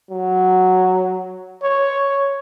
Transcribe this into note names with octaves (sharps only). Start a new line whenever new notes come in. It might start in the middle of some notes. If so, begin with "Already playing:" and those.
F#3
C#5